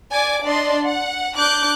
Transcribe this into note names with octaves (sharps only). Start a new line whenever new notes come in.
D5 G#5 D6
D4 D5 D#5 C6
F#5
D4 D6 F#6 G6